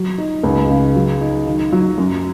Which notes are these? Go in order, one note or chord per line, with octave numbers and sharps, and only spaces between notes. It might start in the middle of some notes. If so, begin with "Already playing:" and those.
Already playing: F#3
D#4
C#2
C#3
F#3
D#4
D#3
F#3
F#2